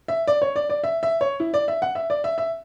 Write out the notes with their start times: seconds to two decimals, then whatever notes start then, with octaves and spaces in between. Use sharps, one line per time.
0.08 E5
0.28 D5
0.42 C#5
0.56 D5
0.70 D5
0.84 E5
1.03 E5
1.21 C#5
1.40 E4
1.54 D5
1.68 E5
1.82 F#5
1.95 E5
2.10 D5
2.24 E5
2.38 E5